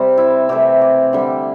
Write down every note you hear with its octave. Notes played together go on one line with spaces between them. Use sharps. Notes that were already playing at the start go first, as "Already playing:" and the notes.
Already playing: C3 G3 C5
E4
C3 E3 A3 G4
D5
D3 G3